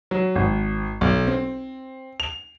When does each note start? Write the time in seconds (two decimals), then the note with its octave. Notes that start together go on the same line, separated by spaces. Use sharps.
0.11 F#3
0.36 G#1
1.01 B1
1.27 C4
2.20 F7